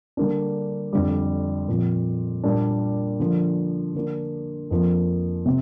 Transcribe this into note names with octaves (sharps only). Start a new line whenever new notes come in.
D3 G3 A#3 D4
F2 D3 G3
A#2 F3 C4
A#2 G3 A#3 D4
D3 F3 A#3
D3 A#3 D4
F2 F3 A#3
C3